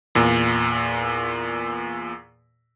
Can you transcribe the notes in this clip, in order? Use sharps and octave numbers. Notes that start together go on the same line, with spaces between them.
E2 A#2